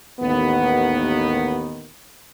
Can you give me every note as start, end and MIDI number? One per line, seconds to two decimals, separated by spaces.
0.20 1.86 33
0.20 1.86 39
0.20 1.86 51
0.20 1.86 59